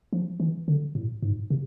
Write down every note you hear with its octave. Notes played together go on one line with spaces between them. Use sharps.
F3
E3
D3
A2
G#2
C3